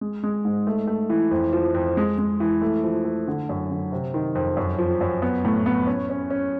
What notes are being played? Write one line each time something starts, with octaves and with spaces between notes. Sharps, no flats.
G#3
G#3
G#2
A3
A3
E3
F2
F3
F2
G#3
G#3
E3
A3
F3
A3
D3
F#2
D3
C3
D#3
F2
F#2
F3
F#2
B3
A2
B3
C#4
C#4
C#4